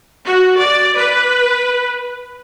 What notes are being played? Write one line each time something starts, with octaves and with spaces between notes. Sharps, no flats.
F#4
D5
B4